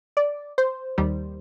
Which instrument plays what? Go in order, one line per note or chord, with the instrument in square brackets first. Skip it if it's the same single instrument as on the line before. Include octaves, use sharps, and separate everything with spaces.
[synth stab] D5
C5
D#2 D#3 G3